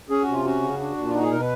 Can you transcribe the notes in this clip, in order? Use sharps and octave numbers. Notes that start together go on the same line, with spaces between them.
C#4 G#4
F#4
C3
F4
C#4 F#4
C#3
D4
A#2
F4
D#4 F#4
G#4
B2 A#4
B4